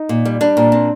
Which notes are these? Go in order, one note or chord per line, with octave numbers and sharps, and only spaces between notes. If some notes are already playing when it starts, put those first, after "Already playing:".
Already playing: D#4
A#2
G3
G3 D4
A#2
C4